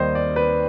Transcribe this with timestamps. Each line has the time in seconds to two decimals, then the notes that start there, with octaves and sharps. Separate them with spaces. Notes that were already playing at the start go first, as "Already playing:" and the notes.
Already playing: D#2 D#3 G3 C5 D#5
0.15 D5
0.36 B4